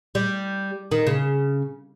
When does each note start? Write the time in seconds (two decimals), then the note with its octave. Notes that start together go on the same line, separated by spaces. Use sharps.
0.15 G3
0.91 D#3
1.07 C#3